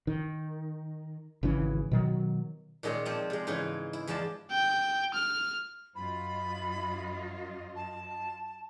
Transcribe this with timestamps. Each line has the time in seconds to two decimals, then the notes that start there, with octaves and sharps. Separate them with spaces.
0.07 D#3
1.43 G#1 C#3 E3 C#4
1.91 B2 D#3 F#3
2.83 A#2 D#3 G#3 C#4 G#4
3.05 F3 C4 D5
3.30 C3 G#3
3.47 G#2 C#3 E3 D#4
3.93 E4
4.07 E2 F3 G#3 D5 A5
4.51 G5
5.14 F6
5.95 F#2 F4 D#5 B5
7.76 A5